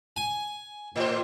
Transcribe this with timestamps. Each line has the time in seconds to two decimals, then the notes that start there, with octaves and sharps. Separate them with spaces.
0.16 G#5
0.96 A2 C5